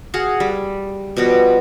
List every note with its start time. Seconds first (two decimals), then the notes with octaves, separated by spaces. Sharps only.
0.14 F#4 G#4 F5 F#5
0.40 G3
1.17 B2 F3 G3 F#4